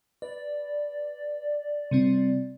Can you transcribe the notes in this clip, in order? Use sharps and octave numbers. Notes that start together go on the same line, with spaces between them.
B4 D5
C3 G3 C4